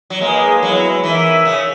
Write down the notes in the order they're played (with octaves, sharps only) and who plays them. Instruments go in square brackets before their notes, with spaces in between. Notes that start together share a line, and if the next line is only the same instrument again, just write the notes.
[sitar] F#3
[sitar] G#3 [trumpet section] A#3 D#4 G#4 B4
[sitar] F#3 [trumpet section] G#3 B3 E4
[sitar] E3 [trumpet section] D#4 A#4 E5
[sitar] C#3